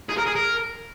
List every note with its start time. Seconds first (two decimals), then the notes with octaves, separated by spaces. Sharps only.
0.09 G#4
0.18 A#4
0.27 G#4
0.36 A#4